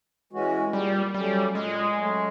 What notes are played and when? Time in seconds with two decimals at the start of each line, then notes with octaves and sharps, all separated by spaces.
0.33 E3 G#3 C#4 F#4
0.73 A#2 G3
1.14 F#3 G3 A3 C#4
1.55 A#2 G#3
1.98 F#3 A3 C#4